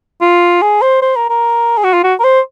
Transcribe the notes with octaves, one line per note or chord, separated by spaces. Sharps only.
F4
G#4
C5
C5
A#4
A#4
G#4
F#4
F4
F#4
A#4
C5